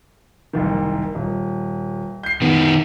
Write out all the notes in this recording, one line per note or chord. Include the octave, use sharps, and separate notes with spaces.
F#1 C2 D#3
D#1
G6 C7
D#3 B3